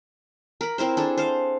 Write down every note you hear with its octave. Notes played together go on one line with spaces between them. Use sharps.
A#4 B5
C4 E4 A#4 C5
D4 G#4 A4
C5 F5